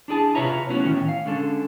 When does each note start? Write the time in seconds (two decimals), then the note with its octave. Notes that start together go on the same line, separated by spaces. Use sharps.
0.08 D4 E4 G#4 A5
0.35 C3 F4 B4 C#5 E5 A#5
0.69 F#3 A3 B3 C#4 E4 F#4
0.85 A2 D#3 C#4
1.09 F5
1.26 D3 G#3 C#4 A4